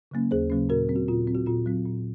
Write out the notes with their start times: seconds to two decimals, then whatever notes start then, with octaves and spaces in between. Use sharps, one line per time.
0.11 C#3 F#3 A#3 C#4
0.31 D#2 G#4 C5
0.50 C#3 F#3 A#3 C#4
0.69 A#2 F#4 A#4
0.89 F#3 C4
0.96 F#4
1.08 A#2 F4
1.27 F#3 C4
1.35 F#4
1.46 A#2 F4
1.66 F#3 C4
1.86 A#2